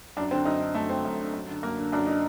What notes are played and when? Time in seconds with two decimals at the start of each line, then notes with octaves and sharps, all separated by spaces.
0.17 F#2 D4
0.31 D3 C4
0.45 F#2 D#4
0.61 D3
0.75 F#2 A3
0.89 D3 C4
1.05 F#2
1.19 D3
1.33 F#2
1.48 D3
1.63 F#2 A#3
1.78 D3
1.92 F#2 D4
2.07 D3 D#4